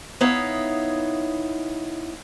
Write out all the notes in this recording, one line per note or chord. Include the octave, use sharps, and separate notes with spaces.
B3 D#4 E4 C#5 F5